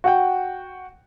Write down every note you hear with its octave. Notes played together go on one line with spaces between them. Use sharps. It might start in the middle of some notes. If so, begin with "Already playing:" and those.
F#4 F#5 G5